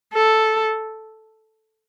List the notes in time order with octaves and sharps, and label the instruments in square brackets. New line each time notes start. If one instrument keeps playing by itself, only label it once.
[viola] A4